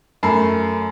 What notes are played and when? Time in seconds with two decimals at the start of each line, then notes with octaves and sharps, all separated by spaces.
0.23 F#2 A3 A#4 A5 B5 C7